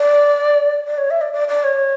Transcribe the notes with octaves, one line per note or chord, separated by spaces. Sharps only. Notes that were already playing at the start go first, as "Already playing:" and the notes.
Already playing: D5
D5
C#5
E5
D5
D5
D5
C#5